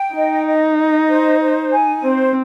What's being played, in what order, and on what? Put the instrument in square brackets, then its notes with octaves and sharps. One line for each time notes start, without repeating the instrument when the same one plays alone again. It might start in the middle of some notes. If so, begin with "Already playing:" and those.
Already playing: [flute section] G5
[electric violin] D#4 [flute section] D#5
[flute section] D#5
D#5
C5
C5
G#5
[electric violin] C4 [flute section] C5